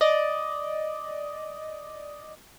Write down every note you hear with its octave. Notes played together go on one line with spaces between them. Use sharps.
D5 D#5